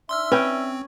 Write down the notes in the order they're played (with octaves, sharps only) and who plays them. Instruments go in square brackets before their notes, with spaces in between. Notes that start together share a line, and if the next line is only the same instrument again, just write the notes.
[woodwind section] D4 D#4 E5 [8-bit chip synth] C6 E6 F6
[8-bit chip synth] C4 [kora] C#4 [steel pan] B4 G5